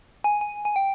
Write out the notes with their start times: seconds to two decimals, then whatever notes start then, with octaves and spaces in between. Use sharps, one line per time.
0.24 G#5
0.41 G#5
0.65 G#5
0.76 G5